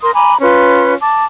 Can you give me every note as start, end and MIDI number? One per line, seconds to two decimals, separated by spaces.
0.02 0.11 70
0.02 0.11 84
0.02 0.11 87
0.14 0.35 80
0.14 0.35 82
0.14 0.35 83
0.14 0.35 86
0.41 0.94 61
0.41 0.94 65
0.41 0.94 71
0.41 0.94 84
1.00 1.24 81
1.00 1.24 86